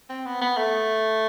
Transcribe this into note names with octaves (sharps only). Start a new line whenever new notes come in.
C4
B3
B3
A3